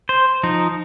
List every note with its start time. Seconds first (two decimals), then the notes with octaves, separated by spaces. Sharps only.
0.09 C5
0.43 F3 D#4